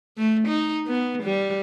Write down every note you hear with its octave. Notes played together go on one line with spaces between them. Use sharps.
A3
D#4
B3
G3